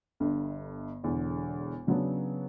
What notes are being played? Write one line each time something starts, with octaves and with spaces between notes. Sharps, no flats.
G1 G2 D3
E1 E2 D3
C#3 F#3 B3 D4